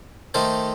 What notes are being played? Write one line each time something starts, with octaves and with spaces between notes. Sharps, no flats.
D#3 A3 D#4 A4 C5